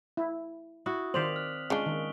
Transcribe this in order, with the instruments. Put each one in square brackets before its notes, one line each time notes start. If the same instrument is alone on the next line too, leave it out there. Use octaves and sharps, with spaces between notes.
[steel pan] E4
[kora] E4 F#4 [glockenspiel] D#6
[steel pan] D#3 C5 [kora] C4 D5 F5 [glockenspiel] B6 F7 F#7
[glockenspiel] F6 F#6
[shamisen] C#3 D4 [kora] G#3 F4 [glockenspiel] C#6 D7 G7
[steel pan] D#3